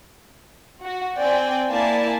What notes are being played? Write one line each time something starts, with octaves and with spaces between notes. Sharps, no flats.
F#4
C4 D5 G5 G#5
A#3 E4 A#4 D5 G#5 A5